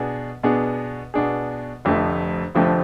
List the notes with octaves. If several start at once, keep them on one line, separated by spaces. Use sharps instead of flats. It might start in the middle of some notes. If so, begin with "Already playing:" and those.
Already playing: B2 B3 D4 G#4
B2 B3 D4 G#4
B2 B3 D4 G#4
F1 F2 D3 F3 A3
F1 F2 D3 F3 A3